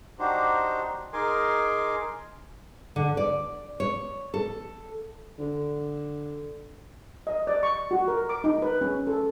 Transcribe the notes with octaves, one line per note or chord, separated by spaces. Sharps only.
D4 D#4 F#4 G4 C5
D#4 G#4 A#4 G#5 C6 D6
D3
D5
C#5
A4
D3
D#5
D5
C#6
F#4
A#4
D6
D#4
B4
C#4
A4